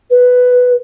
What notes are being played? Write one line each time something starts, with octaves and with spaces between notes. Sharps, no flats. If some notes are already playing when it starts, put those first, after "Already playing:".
B4